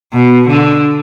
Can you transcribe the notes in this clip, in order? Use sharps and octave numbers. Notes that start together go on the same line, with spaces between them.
B2
D3